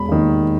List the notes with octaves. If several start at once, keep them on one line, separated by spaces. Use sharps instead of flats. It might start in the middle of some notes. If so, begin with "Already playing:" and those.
Already playing: E1 B5
D#2 D#3